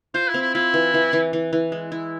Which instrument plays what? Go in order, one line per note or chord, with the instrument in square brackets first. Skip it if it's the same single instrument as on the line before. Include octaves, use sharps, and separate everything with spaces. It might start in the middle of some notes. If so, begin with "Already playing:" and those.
[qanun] F4 [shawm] C5
[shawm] E4
[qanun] C4
[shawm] E4
[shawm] E4 [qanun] F4
[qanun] E3
E3
E3
E3
E3
G#3
E4